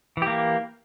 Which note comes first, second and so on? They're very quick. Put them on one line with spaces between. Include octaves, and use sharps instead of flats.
E3 G4 A#3